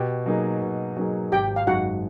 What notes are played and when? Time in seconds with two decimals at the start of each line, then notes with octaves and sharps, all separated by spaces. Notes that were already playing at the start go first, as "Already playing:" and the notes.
Already playing: B2 G4 G5
0.26 F#3 A#3 D#4 G#4
0.62 B2
0.97 F#3 A#3 D#4 G#4
1.32 G#1 G4 G5
1.56 F5
1.67 F#2 D#3 G#3 F#4 F#5